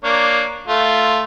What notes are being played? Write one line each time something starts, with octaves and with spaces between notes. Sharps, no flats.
A#3 D4 C#5
A3 F4